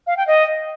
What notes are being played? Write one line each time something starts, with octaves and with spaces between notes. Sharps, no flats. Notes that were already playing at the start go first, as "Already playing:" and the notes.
F5
G5
D#5